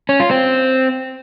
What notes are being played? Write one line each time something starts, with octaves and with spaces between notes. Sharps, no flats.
C#4
F4
C4